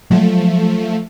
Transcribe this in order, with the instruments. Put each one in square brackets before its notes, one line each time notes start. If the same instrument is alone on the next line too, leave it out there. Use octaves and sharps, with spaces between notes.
[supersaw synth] F3 A3 [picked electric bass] F#3 G#3